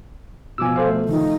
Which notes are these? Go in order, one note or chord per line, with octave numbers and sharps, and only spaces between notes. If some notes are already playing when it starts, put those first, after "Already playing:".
B2 F3 G#5 D6 E6
A4 C5 F5
A3
D#3 F3 D#4